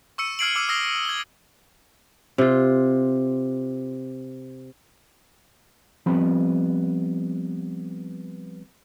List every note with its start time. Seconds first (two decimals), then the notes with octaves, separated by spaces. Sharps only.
0.18 C#6 E6 C#7 D#7
0.39 E6 F6 G#6 C7 D7 F#7
0.56 D6 E6 F6 D#7
0.68 D#6 E6 A#6 C7 G7
1.05 G#6 G7
2.38 C3 F4
6.06 F3 G3 B3 C4 B5